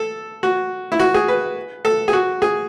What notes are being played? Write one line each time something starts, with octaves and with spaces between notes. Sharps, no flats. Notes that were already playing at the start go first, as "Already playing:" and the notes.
Already playing: A4
F#4
E4
F#4
G#4
B4
A4
G#4
F#4
G#4